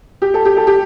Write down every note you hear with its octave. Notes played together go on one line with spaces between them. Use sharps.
G4
A4
G4
A4
G4